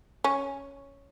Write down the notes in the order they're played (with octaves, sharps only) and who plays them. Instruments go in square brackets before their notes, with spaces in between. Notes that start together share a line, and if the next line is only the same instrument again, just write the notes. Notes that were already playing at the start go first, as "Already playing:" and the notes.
[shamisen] C#4